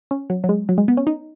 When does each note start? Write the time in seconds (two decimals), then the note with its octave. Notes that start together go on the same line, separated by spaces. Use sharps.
0.11 C#4
0.30 F#3
0.44 F#3
0.49 G#3
0.69 F#3
0.78 G#3
0.88 B3
0.97 C#4
1.07 D#4